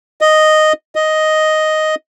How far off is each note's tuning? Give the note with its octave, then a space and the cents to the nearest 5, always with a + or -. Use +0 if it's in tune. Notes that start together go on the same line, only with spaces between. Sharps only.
D#5 -5
D#5 +0